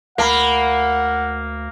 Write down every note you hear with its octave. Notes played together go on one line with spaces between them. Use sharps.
D2 A#3 F5 F#5 A#5 B5